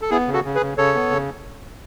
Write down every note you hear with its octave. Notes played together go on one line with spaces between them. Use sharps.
A4
B3 E4 G#4
C#3
F#4 A4
C#3
G#4 B4
C#3
C#3 A4 C#5
B3
C#3